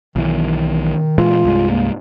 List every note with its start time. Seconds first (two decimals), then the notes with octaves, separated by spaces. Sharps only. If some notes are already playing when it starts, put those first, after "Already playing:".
0.16 B1 D#3 E3
1.18 A#2 E3 G#3 F4
1.45 C2 G2 G#3
1.70 A#3